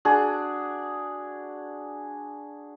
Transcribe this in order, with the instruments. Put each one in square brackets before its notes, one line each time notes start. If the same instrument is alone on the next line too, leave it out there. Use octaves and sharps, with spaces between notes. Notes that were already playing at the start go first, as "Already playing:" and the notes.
[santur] D4 F#4 G#4